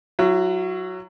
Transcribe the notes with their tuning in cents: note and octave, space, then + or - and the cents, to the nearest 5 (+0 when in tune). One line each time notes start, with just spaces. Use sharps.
F#3 +0 E4 +40